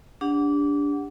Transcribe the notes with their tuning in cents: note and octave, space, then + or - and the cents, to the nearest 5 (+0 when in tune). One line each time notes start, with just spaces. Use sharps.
D4 -20 G4 +35 F#5 +0